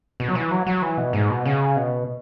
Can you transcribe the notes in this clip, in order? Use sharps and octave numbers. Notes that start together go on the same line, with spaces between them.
B2
F#3
E3
F#3
F#3
E3
B2
G#2
B2
C#3
B2